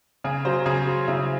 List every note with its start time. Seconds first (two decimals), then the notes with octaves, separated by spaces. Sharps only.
0.24 C#3 G#4
0.45 F#3 C5
0.66 C#3 G#4
0.87 F#3
1.08 C#3 E4